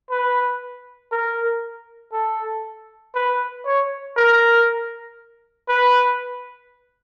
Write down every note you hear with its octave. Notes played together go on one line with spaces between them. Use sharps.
B4
A#4
A4
B4
C#5
A#4
B4